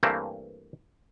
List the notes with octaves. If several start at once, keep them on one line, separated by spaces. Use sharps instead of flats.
G2 E3 A3 A#3 C4 E4